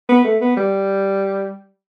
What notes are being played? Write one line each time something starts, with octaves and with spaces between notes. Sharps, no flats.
B3
A3
B3
G3